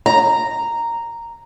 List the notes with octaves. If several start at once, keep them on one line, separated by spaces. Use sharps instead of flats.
A#5